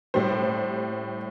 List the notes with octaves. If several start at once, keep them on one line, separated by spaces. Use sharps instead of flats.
A2 G3 C5